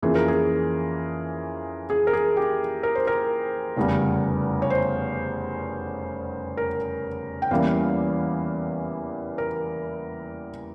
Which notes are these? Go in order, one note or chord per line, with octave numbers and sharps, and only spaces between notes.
F2 E3 A#3 C#4 G#4
A#4
G#4
G#4
A#4
G#4
G4
A#4
C5
A#4
F1 E2 C#3 G3
C#5
C5
A#4
G5
E2 E3 G3 A#3 C#4 F5
A#4